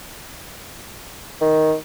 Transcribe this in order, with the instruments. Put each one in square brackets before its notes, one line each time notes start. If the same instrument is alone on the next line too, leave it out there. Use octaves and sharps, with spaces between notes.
[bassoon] D#3